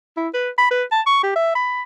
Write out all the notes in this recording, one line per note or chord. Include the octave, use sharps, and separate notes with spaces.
E4
B4
B5
B4
A5
C#6
G4
E5
B5